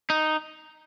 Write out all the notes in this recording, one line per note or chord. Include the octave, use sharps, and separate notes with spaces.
D#4